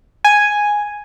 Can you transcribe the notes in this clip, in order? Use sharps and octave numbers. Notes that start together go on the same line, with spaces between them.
G#5